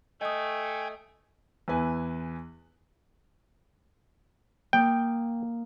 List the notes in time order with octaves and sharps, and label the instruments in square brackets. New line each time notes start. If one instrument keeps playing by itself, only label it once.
[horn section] A3 [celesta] D#5 D#6 [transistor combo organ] G5 G#5
[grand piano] E2 E4 B4 G#5
[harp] A#3 D#6 [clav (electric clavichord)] G5